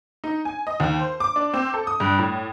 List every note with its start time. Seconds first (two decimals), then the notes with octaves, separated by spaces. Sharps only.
0.24 D#4
0.45 G#5
0.67 D#5
0.80 D#2
0.99 C5
1.20 D6
1.36 D4
1.54 C4
1.74 A4
1.87 D#6
2.00 G2
2.19 A2